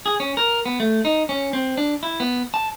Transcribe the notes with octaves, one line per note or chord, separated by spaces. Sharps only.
G#4
C#4
A#4
B3
A3
D#4
C#4
C4
D4
E4
B3
A5